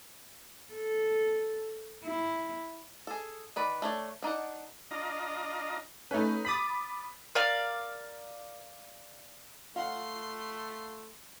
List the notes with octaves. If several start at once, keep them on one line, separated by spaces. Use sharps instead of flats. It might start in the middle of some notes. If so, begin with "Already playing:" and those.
A4
E4
G#4 A4
D#3 B4 D5
A3 D4 C#5
D4 D#4 D5 F#5
D4 F4 D#5 A#5
A3 C#4 D#4 B4
B5 D6 D#6 A6 B6
A#4 D5 F5
A3 F4 F5 F#5 C6